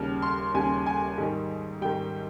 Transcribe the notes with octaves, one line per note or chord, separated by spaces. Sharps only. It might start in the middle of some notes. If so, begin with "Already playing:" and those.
Already playing: D#2 C#3 G3 F6
C6
D#2 C#3 G3 G#5
G#5
G#2 D#3 G3
G#2 D#3 G3 G5